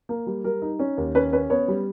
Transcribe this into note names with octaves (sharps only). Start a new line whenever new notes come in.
A#3
G3
G3 A#4
D#4
C#4
D#2
C#4 B4
C#4 B4
B3 C#5
G3